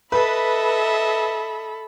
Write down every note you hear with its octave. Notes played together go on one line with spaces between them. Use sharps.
A4 B4 D#5 E5 B5